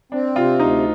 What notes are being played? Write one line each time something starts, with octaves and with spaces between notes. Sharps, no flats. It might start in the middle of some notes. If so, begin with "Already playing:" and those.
C4 D4
C3 F4
D2 D#4